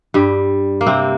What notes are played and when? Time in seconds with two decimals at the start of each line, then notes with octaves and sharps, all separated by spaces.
0.14 G2 G3
0.81 A#3
0.86 C3 C4